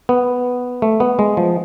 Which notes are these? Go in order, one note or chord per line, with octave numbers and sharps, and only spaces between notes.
B3
A3
B3
G#3
F3